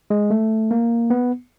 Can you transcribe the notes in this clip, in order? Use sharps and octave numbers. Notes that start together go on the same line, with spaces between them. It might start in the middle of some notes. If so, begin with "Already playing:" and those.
G#3
A3
A#3
B3